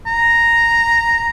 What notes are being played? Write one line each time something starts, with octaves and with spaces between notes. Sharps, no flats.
A#5